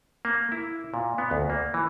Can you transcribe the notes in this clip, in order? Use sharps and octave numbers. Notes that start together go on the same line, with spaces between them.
A#3
E4
A#2
B3
D2
A#3
E3